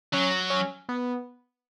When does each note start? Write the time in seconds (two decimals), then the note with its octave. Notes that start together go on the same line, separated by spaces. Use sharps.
0.13 F#3 C#4
0.50 C#4
0.89 B3